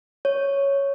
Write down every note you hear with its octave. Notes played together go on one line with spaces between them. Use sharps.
C#5